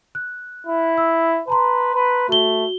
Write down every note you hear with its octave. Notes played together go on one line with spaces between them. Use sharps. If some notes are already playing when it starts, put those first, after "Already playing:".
F#6
E4
E6
B4 A5 A#5 C6
B4
A3 F#4 G7